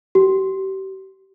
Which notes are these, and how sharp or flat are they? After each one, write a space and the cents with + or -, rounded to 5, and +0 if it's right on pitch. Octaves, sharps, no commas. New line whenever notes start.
G4 -35